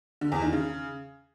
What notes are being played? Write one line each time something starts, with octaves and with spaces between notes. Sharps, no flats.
D3
E2
D#3
C#3